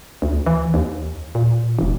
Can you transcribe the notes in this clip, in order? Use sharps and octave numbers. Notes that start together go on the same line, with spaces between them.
D2
E3
D#2
A#2
E1